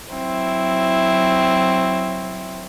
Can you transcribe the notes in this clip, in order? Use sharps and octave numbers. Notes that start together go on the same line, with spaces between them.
F#3 C4 E4